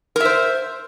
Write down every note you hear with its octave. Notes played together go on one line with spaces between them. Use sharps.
A#4 C5 E5